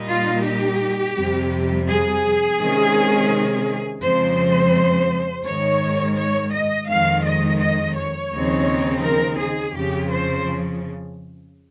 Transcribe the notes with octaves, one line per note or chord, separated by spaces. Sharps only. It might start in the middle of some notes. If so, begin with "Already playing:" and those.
Already playing: A#2 G3 A#3 D#4
F4
G4
F2 C3 G3
G#4
C3 D#3 G#3 C#4
F2 C#3 F3 G#3 C4 C5
G#2 D#3 G#3 C#5
C#5
D#5
F2 D#3 G#3 F5
D#5
D#5
C#5
D#2 C#3 F3 C4 D#4
A#4
G#4
F2 C#3 F3 G4
C5